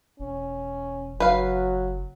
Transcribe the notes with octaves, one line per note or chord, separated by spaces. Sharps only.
E1 C#4
F#1 F#3 B4 F5